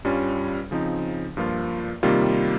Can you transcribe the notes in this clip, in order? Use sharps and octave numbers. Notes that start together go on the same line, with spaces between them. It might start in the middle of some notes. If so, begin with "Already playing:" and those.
G2 G3 C#4 F4
C#3 F3 C4 D#4
G2 F3 A#3 F4
C3 D#3 G3 A#3 F4